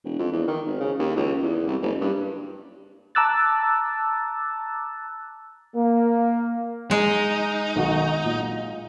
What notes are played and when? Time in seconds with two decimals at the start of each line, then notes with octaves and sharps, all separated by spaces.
0.04 E1
0.19 F2
0.32 E2
0.48 D#3
0.66 G#1
0.81 C#3
0.99 D#2
1.16 C#2
1.42 E2
1.67 C2
1.82 F#1
2.01 G2
3.15 A5 A#5 D6 E6 F#6 A6
5.74 A#3
6.91 G#3 D#4
7.76 B1 D#3 F#4
8.24 A#2